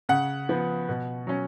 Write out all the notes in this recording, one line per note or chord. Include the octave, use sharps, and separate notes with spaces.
C#3 F#5
F3 B3
B2
F#3 C#4